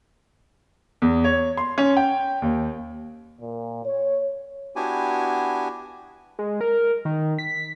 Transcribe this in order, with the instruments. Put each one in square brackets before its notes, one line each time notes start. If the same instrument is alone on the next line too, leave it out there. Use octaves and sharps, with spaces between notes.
[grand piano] E2
C#5
C6
C#4
G5
D#2
[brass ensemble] A#2
C#5
[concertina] B3 D4 E4 F#4 G4 G#5
[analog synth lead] G#3
A#4
D#3
B6